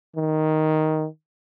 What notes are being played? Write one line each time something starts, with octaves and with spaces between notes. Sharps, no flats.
D#3